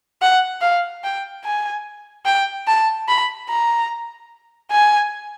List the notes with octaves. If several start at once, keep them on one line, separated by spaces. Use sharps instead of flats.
F#5
F5
G5
G#5
G5
A5
B5
A#5
G#5